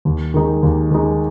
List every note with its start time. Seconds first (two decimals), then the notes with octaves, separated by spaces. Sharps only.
0.05 D#2
0.34 D#3 G#3 D#4
0.63 D#2
0.91 D#3 G#3 D#4